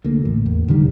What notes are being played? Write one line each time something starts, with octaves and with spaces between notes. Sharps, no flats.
D2 A3 A#3
A1
E2
E1 D3 D#3 G3